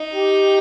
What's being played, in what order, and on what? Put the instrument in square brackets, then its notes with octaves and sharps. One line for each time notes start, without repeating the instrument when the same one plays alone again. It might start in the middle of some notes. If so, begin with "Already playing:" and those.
Already playing: [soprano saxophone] D#4
[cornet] G4